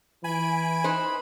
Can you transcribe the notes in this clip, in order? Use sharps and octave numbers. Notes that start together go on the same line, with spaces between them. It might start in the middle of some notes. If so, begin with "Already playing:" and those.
E3 G#5 B5 D7
D#4 B4 C5